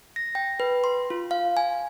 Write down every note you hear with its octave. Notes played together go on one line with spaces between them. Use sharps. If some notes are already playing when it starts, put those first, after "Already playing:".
A#6
G5
B4
C6
F4
F5
G#5